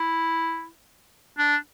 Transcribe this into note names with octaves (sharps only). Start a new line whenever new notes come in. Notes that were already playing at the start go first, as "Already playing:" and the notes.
Already playing: E4
D4